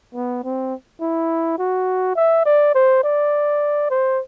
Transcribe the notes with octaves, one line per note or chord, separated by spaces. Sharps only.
B3
C4
E4
F#4
E5
D5
C5
D5
C5